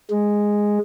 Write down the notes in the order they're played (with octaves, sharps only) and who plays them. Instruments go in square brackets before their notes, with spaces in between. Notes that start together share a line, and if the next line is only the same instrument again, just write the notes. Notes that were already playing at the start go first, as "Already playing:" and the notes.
[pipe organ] G#3